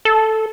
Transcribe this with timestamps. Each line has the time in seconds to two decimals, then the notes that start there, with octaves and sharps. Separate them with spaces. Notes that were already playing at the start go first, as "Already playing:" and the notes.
0.05 A4